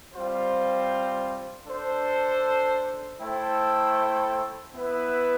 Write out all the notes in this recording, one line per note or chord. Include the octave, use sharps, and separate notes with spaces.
G3 C4 F4 C5
D4 A4 C5
A3 E4 A4 C5 G5
B3 E4 B4 E5